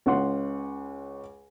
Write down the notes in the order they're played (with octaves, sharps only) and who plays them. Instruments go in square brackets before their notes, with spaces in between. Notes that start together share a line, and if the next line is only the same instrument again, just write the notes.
[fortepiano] C#2 C#3 F#5 C6